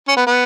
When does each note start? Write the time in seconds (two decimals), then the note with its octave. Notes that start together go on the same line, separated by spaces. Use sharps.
0.08 C#4
0.17 B3
0.27 B3